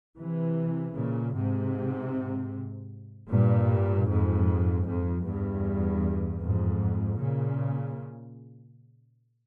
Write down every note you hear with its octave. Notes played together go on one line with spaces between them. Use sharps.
C3 E3
A#2 C#3
G#2 C3
G2 A#2
F2 G#2
F2
E2 G2
F2 G#2
A#2 C#3